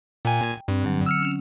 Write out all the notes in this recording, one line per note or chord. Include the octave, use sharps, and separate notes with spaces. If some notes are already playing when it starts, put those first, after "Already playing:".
A#2 G5 G#5
G2 C4
D3 F#3
E6 F6 C#7
C#4